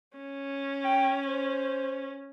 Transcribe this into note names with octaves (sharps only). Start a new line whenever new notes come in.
C#4
G5
C5